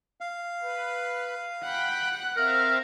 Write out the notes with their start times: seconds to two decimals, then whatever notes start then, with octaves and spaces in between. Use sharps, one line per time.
0.21 F5
0.61 B4
1.63 F#5 G5 B5
2.37 C4 A#4 E5 F5